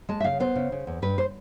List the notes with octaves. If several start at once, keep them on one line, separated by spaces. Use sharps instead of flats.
G#3 A5
E5
C#3 F5
B3 C5
C#3
C#3
E2
G2 B4
C5